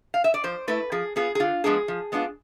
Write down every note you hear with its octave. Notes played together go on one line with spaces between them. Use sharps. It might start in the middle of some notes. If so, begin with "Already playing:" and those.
F5
E5
D5
F3 C5
A3 E4 B4
F3 G#4
B3 F4 G#4
G#4
D3 F4
F3 G#3 B3 D4 G#4
F3
G#3 B3 D4 F4